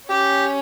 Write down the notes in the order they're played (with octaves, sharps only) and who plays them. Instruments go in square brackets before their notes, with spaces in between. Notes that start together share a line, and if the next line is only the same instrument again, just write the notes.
[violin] C#4 [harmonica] G4